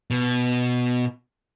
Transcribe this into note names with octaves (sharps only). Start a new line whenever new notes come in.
B2